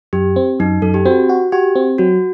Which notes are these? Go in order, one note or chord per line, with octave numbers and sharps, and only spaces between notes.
F#2 G4
C4
F#2 D#4
F#2 A4
G4
C4 F#4
F#4
F#4 G4
C4
F#3 F#4